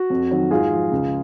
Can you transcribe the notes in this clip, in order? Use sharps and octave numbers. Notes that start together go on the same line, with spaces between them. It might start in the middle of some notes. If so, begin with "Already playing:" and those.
Already playing: F#4
F2
D#3 F#3
G#2 F4 G#4
F3
C#2